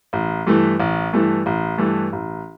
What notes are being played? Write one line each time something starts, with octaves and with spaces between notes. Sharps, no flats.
A1
G2 E3 A3
A1
G2 E3 A3
A1
G2 E3 A3
A1